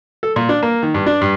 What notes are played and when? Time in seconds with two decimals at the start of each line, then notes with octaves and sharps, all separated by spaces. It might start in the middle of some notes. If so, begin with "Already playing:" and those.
0.23 A4
0.36 A#2
0.49 D4
0.63 A#3
0.83 D#3
0.94 G2
1.06 D4
1.21 G2